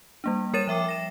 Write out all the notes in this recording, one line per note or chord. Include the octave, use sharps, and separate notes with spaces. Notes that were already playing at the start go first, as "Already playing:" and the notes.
G3 A#3 D4
G3 A#4 C#5 A6 D#7 E7
F3 E5 G5 D6
A#6 E7